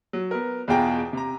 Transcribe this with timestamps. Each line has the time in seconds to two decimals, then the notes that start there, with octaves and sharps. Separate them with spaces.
0.13 F#3
0.31 B3 A#4
0.68 E2 B2 F4 G#4 G5 A#5
1.13 C3 A#5